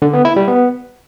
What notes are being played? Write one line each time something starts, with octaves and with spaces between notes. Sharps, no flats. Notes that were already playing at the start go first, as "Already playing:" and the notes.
D3
B3
E4
G3
B3